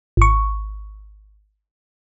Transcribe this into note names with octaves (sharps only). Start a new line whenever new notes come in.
G#1 C#6